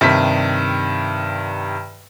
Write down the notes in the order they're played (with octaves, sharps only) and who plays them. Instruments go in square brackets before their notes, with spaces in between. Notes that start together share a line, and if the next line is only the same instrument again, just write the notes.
[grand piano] G2 C3 D#3 B6